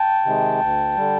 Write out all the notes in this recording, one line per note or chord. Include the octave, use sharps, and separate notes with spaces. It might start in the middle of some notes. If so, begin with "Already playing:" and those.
Already playing: G5 A5
C3 D#3 G#3
D2
D3 G3